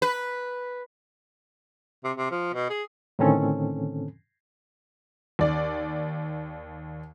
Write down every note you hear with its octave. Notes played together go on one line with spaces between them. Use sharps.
B4
C3
C3
F3
B2
G#4
A2 D3 D#3 C4 C#4 A4
D#2 D5